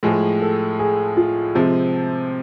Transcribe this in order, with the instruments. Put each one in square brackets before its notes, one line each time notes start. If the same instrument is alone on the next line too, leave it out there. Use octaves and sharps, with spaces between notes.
[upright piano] A2 F3 G#3 [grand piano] G#4
[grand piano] A4
G#4
F4
[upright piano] C3 F3 G#3 [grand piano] C4